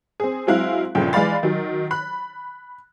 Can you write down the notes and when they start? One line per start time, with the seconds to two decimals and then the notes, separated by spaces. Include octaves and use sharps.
0.20 C4 G#4
0.47 F#3 G#3 C4 E4 F5 F#6
0.95 G1 A#2 C#3 F3 G5
1.13 E3 G#3 D5 F5 B5 A6
1.43 D#3 F#3
1.91 B5 F#6